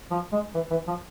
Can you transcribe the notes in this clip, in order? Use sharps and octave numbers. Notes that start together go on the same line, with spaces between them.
F3
G#3
E3
E3
F3